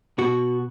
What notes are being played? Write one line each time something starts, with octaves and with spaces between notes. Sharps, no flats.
B2 F#4